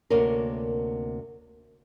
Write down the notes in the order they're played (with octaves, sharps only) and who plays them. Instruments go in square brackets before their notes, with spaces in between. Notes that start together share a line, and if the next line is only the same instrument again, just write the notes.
[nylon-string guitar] D2 C3 A#3 C#4 A#4